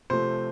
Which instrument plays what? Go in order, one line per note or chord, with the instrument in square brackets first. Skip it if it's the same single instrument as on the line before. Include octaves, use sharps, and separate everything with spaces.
[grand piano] C3 F3 A3 C5